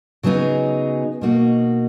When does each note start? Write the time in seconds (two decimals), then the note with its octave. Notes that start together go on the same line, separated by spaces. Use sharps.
0.23 C#3 F#3 B3 D#4 G#4
1.21 B2 A#3 D#4 F#4